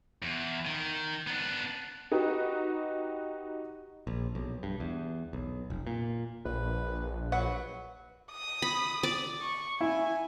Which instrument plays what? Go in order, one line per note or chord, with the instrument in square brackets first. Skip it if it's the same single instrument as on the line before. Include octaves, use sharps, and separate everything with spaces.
[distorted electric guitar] E2
D#3
B3 D4
[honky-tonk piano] D#4 F#4 G4 B4 D#5
[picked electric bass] A#1
B1
G2
E2
B1
F1
A#2
[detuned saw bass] A#1 [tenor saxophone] B4
[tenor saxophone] F#3 [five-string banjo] B4 F#5
[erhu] D#6
[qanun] B5
D5
[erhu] C#6
[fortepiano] E4 [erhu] G#5